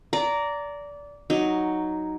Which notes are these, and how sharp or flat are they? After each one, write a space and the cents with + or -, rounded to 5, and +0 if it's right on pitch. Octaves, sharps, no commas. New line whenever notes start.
D5 -20 A#5 -5
F#3 +0 D#4 +0